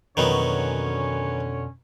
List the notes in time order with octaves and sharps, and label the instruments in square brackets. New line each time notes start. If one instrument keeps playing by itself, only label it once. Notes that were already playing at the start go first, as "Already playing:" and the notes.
[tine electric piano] F2 B2 [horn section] D3 C#4 C#5 [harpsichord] D#3 F#3 B3